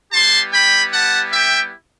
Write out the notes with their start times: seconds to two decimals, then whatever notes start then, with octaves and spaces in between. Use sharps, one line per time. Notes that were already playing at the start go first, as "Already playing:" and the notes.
0.12 G3 B3 E4 G4 A5 C6
0.53 G5 B5
0.93 F#5 A5
1.33 E5 G5